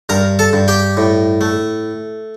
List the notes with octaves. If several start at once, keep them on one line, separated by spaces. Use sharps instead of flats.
G2 A#4 A#5
A4 A5
G2
G4 G5
A2
A3